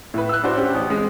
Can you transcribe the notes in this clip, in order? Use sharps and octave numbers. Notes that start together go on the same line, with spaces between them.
A2 B4
E6 F#6
D4 E4 F#4 C5
C#4 G4
A1
G#3 C4